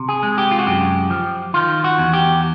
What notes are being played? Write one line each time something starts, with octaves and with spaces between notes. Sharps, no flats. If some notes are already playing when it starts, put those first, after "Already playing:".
Already playing: C3
G#4
G#3
G4
F4
F#4
F#2 G4
F3
D#3 F4
F#4
E2
G4